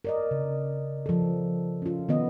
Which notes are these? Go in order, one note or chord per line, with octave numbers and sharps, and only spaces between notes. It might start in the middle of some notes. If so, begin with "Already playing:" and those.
A#4 D5 D#5
C#3
F3 A4
C#4 F4
D#3 B3 D#5